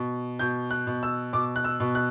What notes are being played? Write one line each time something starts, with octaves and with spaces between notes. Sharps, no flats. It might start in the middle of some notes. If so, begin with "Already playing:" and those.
Already playing: B2
B2 G6
F#6
B2
E6
B2 D6
F#6
E6
B2
F#6